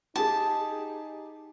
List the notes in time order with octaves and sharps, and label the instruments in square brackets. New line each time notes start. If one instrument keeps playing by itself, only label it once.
[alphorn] D#4 [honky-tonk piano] G4 G#4 [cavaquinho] A5